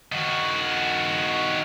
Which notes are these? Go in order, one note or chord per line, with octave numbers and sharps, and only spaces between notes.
D#3 F#4